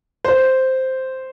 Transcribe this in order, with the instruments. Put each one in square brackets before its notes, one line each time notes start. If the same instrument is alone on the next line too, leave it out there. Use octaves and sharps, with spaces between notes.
[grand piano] C5